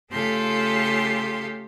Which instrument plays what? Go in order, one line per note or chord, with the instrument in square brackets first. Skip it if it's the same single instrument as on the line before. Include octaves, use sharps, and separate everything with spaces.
[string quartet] C#3 A3 F4 G4 A4 C6